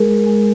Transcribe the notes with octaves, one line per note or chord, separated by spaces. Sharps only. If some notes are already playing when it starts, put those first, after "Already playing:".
Already playing: G#3 G#4 A#4
G#3